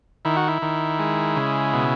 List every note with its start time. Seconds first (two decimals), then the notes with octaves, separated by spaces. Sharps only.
0.25 D#3 E4
0.36 F#4
0.48 E4
0.62 D#3
0.99 G#3
1.36 C#3
1.74 B2